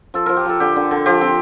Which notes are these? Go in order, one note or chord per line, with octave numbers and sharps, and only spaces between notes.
F3 A4
F3 A#4
G4
F3 A4
D3 G4
D3
D3
F3 G4
C4